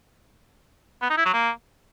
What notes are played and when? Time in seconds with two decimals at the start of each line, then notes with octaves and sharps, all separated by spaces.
1.02 B3
1.10 D#4
1.18 E4
1.26 F#3
1.34 A#3